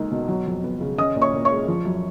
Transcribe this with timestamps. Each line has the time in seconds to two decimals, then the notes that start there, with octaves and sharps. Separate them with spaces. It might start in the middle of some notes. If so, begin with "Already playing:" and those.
Already playing: C#2 A#3 D#4
0.11 B2
0.28 F#3
0.46 F2
0.63 B3
0.81 C#3
0.98 C#4 D#5 D#6
1.16 A#2
1.22 C#5 C#6
1.33 A#2
1.45 C#5 C#6
1.51 G#3
1.68 F3
1.85 F#2